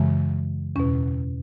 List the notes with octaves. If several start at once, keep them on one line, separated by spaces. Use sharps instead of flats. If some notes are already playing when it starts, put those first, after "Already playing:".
Already playing: F#2 C#3 E3 G#3
E2 B2 C#4